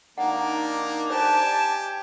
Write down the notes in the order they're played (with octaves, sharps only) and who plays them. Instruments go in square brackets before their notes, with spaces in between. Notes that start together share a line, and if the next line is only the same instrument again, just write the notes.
[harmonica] D#3 A#3 [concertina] D4 D#4 D5 [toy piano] F#5
[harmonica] G4 G#5 [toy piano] C5 [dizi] A5